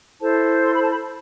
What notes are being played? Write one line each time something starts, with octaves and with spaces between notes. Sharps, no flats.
E4 A4 C5 A5
C6
B5
A5
B5